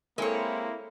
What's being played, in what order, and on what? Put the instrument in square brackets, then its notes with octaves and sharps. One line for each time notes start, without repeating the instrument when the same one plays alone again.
[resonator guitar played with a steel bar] G#3 C#5 [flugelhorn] A#3 [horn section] C4 E4 [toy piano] A4 A#4